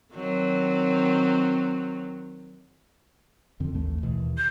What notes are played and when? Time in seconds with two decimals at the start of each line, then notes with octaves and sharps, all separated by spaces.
0.15 D#3 F#3 C4
3.60 F2 D3 C4
3.74 A1 D#2 A3
4.03 D#2 B2 E3
4.37 G6